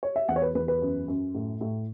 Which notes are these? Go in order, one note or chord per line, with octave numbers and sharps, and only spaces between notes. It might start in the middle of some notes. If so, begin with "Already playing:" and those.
C#5
E5
E2 F#5
C#5
B4
E2 B4
B4
F#2
F#2
A2
A2